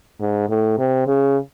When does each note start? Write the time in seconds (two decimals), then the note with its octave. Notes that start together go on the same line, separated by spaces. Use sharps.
0.20 G#2
0.49 A2
0.78 C3
1.07 C#3